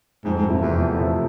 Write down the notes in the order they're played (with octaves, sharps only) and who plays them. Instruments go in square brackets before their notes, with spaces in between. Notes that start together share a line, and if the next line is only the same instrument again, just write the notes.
[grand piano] F2 [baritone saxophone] G#2
[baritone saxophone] G#2
[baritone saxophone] F2 [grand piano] C3 F3 A3 E4
[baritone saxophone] E2
[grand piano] F2
C3 F3 A3 E4